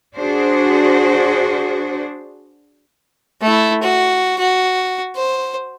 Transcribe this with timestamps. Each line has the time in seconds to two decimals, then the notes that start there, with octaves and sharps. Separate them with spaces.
0.15 D4 F#4 G#4 C5
3.42 A3 E4
3.82 F#4
4.39 F#4
5.16 C5